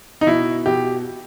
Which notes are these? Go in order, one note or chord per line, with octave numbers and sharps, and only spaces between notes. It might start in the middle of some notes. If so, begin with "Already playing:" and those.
D#4
B2 E4
B2 G4